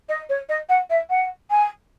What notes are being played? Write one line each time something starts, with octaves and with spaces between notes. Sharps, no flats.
D#5
C#5
D#5
F#5
E5
F#5
G#5